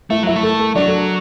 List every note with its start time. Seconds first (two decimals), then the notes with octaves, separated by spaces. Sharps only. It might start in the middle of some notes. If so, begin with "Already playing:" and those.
0.10 A3 E4 E5
0.23 F#3 E4 E5
0.36 A3
0.43 A4
0.59 A4
0.75 F#3 D4 D5
0.87 A4